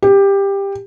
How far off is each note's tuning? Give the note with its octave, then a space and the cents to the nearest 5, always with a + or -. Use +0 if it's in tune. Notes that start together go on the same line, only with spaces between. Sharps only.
G4 +15